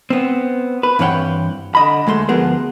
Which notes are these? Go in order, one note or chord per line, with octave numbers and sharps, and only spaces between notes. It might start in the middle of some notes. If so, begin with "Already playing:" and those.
B3 C4
B4
G2 E3 C4 C#5 F#5 G5
D3 D#5 B5
D2 G#3 A3 C6
D2 F3 B3 G#4 A#4